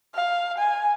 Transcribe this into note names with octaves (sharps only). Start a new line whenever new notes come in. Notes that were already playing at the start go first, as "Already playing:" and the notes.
F5
G#5